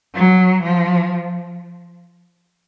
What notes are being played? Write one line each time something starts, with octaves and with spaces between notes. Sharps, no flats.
F#3
F3